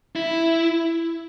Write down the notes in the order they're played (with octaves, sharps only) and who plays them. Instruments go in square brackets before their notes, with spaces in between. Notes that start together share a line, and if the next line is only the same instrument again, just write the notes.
[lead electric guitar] E4